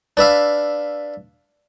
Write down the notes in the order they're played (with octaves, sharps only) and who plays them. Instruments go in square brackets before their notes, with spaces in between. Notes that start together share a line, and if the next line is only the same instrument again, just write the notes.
[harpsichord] D4 B4 E5 F5